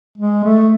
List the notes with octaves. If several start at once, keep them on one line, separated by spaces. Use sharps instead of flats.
G#3
A3